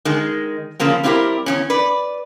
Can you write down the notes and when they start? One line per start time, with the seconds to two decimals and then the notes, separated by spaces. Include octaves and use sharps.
0.05 D#3 G#3
0.80 C#3 F3 A#3 C4
1.03 G3 C4 E4 F#4 G4 A#4
1.46 E2 A#2 C#4
1.70 B4 D5